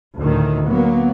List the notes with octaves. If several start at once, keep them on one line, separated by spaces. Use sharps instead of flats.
D2 A2 D#3
F#3 A#3 B3